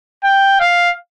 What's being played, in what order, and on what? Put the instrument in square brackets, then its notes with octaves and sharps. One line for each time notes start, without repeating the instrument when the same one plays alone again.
[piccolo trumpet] G5
F5